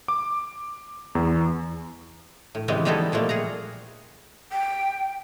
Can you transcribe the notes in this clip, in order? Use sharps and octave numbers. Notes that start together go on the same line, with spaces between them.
D6
E2
A2
C#3 E3 G3 G#3 B3 C4
G3 G#3 B3 D#4 E4 A4
A#2 F3 G3 A3 A#3
G#4 F#5 A#5
G5